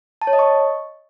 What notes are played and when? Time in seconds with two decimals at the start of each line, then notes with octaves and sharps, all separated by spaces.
0.22 A5
0.27 C#5
0.33 D#5
0.39 C#6